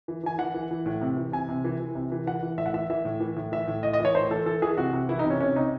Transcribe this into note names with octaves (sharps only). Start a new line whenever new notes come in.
E3
E3 G#5
E3 F#5
E3
E3
A2
C3
E3
C3 G#5
C3
E3
E3
C3
E3
E3 F#5
E3
A2 E5
F#5
E3 E5
E3 E5
A2
E3
A2
E3 E5
A2
A2 D#5
D#5
E3 C#5
A2 C5
E3 A4
E3 A4
E3 G#4
C3 F#4
C3
E3 E4
D#4
C3
C#4
C3 C#4
C3 D#4